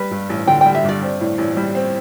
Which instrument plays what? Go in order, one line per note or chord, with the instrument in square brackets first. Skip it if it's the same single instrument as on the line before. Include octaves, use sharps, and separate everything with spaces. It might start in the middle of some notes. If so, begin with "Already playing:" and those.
Already playing: [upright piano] G3 [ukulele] B4
[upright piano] G2
A1
[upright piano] D3 [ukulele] G5
[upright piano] G3 [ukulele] G5
[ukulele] E5
[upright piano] G2 [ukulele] D5
[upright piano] C4
A2
A1
G3
C4